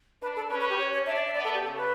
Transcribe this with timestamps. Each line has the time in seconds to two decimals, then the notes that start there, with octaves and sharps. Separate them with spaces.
0.22 D4 B4
0.36 A4
0.50 C#4 B4
0.60 B4
0.70 G4
0.79 C#5
0.93 C#5
1.06 D4 E5
1.16 D5
1.26 E5
1.35 B3 D5
1.44 A4
1.54 G4
1.64 C#3 A4
1.77 B4